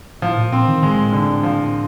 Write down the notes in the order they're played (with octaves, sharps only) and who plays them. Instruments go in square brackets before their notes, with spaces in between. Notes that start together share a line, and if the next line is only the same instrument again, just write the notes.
[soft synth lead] A2 [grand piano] F3
[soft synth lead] A#2
[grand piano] C4
[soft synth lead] D#3
[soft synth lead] A2 [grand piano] G#3
[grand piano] D3
F3